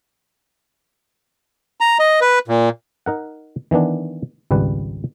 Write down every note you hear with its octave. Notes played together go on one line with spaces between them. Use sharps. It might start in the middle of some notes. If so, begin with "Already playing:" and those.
A#5
D#5
B4
A#2
D#4 A#4 F#5
D#3 E3 B3 D4
G#1 C#2 G3 B4